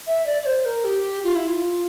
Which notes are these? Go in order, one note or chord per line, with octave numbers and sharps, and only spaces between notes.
E5
D5
D5
C5
A#4
G4
F4
E4
F4